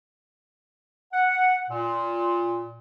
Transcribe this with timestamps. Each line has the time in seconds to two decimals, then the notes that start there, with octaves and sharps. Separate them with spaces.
1.12 F#5
1.69 A#2